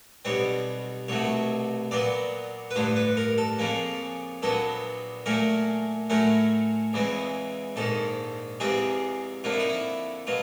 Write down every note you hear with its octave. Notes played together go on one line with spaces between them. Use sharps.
B1 B2 G3 C4 C#5
C2 B2 F#3 A3 C#5
A#2 F#3 B3 D5
B4
A1 G2 D3 C5
B4
A#4
A4
F2 C#3 F3 A#3 C#4
A#1 A#2 F#3 B3 A4
A#2 F#3 A3 C#4 A#4
A2 F#3 A3 C#4 A#4
E2 C#3 E3 G#3 C4
A#1 G#2 D#3 A4
E2 C3 F3 G#3 C4 G#4
F2 D3 F3 A#3 F4
E4
D#4
E4
B2 F#3 F4